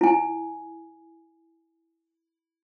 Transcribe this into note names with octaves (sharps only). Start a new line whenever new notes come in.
E4 G#5